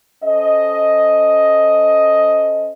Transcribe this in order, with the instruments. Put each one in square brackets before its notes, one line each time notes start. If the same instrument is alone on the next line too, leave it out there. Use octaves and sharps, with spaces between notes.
[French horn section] C#4 A4 C5 D#5